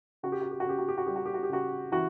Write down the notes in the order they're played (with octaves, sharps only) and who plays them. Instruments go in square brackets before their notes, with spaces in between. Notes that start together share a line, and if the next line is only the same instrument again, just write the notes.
[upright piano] C#3 F#4
G4
F#4
G4
F#4
C#3 G4
F#4
G4
F#4
G3 G4
F#4
G4
F#4
G4
C#3 F#4
E3 F#4